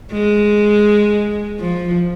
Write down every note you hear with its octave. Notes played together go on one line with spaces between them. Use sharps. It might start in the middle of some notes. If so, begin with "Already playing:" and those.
G#3
F3